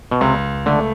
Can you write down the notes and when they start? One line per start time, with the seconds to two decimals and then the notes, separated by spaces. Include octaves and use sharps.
0.11 B2
0.21 C#2 C3
0.66 D3 A3